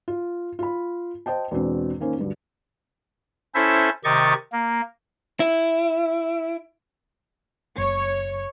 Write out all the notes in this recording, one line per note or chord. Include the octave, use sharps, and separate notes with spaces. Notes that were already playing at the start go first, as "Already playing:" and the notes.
F4
F4 B5
C5 D#5 G5 A5
E2 B2 G#3 C4 D4
D#3 A#3 C#4 C5
D2 G2 D3
C#4 E4 A4 C5 E5
C3 D#3 G4 D#5 C#6 A6
A#3
E4
F#1 C#5